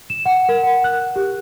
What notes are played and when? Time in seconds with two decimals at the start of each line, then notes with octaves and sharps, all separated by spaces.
0.10 E7
0.26 F#5
0.49 A#4
0.63 F#5
0.84 F#6
1.16 G4